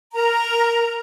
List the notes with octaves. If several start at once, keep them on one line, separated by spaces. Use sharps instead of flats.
A#4 A#5